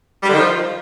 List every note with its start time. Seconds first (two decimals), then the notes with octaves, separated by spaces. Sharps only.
0.23 G3
0.28 D3
0.34 D#3
0.39 F3